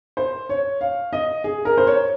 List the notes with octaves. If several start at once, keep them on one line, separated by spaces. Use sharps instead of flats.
C5
C#5
F5
D#5
G#4
A#4
C5
C#5